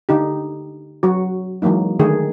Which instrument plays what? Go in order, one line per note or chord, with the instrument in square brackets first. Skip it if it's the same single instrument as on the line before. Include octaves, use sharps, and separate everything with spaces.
[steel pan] D3 D#4 G4
F#3 F#4
E3 F#3 G#3 A#3 D#4
D3 D#3 A3 G#4